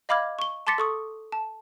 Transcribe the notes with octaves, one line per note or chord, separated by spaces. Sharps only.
D#5 F5 B5 D6 F6 G#6
C#6 G7
A5 C6 D6 A6 B6 C#7
A4 C#6 D#6
A5